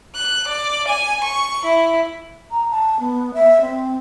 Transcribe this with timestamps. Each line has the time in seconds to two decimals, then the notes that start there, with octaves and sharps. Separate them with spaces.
0.16 F#6
0.48 D5
0.88 G#5
1.24 C#6
1.64 E4
2.50 A#5
2.70 A5
2.99 B3
3.33 E5
3.60 C4